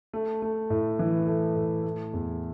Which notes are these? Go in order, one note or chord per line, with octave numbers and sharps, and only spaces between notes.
A3
A3
A2
E3
A3
A2
A3
E2